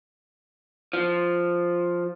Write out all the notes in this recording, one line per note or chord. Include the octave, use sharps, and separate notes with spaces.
F3